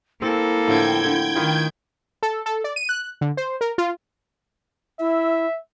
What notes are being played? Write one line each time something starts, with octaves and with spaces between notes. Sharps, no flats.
A#3 C4 E4 A4
A2 D3 F3 G5 G6 G#6
D3
D#3 D#4 F4 B4
A4
A4
D5
D#7
F#6
D3
C5
A#4
F4
E4 E5